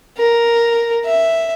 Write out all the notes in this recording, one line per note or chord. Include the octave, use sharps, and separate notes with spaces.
A#4
E5